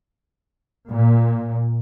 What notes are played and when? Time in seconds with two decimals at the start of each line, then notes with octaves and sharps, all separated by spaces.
0.91 A#2